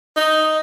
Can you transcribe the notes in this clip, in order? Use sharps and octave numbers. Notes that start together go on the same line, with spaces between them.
D#4